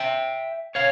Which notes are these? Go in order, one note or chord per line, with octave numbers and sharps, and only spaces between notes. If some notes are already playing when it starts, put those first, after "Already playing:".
Already playing: E5 G5
C#5 F5